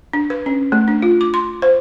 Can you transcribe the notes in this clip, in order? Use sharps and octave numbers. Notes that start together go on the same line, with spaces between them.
D4
B4
C#4
A3
D4
F4
D6
C6
C5